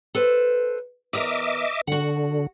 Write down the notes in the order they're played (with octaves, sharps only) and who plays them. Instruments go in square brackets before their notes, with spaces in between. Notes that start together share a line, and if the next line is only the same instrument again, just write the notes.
[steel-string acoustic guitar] A4 B4 C5
[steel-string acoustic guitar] E2 A#4 [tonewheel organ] D#5 E5 D6
[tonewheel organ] D3 [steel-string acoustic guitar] F#4 F#5